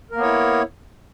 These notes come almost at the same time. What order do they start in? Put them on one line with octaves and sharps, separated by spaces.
A#4 A#3 B3 C#5 E4